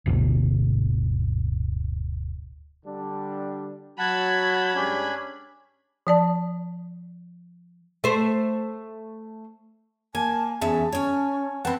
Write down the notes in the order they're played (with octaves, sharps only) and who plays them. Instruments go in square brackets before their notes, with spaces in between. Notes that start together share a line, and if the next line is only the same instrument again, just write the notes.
[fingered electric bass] D1 G1 D2 B2
[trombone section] D3 G3 D4
[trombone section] F#3 [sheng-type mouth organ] F#5 A5 [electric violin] B5 G#6
[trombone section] G2 G#3 G4 [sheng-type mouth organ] C#4 D4
[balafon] F3 D5 A5
[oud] A3 C5
[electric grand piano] A#3 [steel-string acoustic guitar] G#5 [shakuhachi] A5
[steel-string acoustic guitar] E2 C#4 E5 [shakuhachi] G#4 [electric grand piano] A5
[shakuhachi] C#4 [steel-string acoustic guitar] C#5 G#5
[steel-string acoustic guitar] C4 A5 [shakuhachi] B4 [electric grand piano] F#5 G5 B5